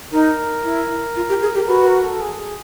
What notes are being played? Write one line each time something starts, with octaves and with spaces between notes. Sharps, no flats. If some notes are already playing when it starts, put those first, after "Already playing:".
D#4 A#4
E4
F4
G4
G#4
G4
A#4
F#4 B4
A#4
A4
G#4
G#4